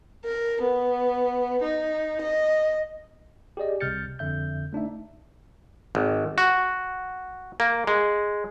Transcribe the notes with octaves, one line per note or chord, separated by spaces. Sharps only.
A#4
B3
D#4
D#5
G4 G#4 D5 D#5
C2 C3 F6 G6 A6 C#7
F2 D3 E5 G6
A3 D4 D#4 E5
G#1
F#4
A#3
G#3